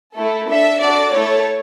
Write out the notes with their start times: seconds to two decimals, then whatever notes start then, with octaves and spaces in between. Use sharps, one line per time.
0.15 A3 E4 A4
0.48 D4 A4 E5
0.80 D4 F#4 A4 D5
1.14 A3 E4 A4 C#5